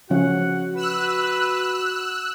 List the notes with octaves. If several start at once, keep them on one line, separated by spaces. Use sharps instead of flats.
C#3 F3 C#4 F#4 F#5
B4 E6 F#6